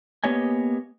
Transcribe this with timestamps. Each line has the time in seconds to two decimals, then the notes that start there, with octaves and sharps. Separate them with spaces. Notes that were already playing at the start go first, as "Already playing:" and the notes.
0.24 A#3 B3 G4 C#5 D#5 G#5